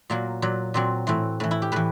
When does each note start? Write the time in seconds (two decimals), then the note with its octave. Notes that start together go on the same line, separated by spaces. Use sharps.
0.10 A#2 F#3 A#3
0.42 A#2 F#3
0.74 A#2 F#3 C4
1.07 A2 E3 C4
1.40 A2 E3
1.51 E4
1.62 G4
1.72 A2 E3 B4